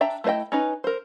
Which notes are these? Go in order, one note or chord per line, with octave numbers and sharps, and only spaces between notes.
D4 E5 G5 A#5
A3 E4 C5 D#5 G5
C#4 D#4 B4
A#4 C5